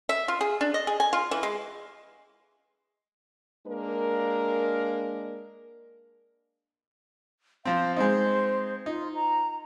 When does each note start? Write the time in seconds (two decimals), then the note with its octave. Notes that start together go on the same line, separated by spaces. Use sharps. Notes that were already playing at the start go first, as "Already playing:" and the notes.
0.09 E5
0.28 F4
0.41 G#4
0.61 D4
0.74 D#5
0.87 G#4
1.00 G#5
1.13 F4
1.31 E3
1.43 G#3
3.67 G#3 A#3 D4 A#4
7.65 F3 C4 F5
7.97 G#3 C4 D#4 C5
8.86 D#4 F4
9.15 A#5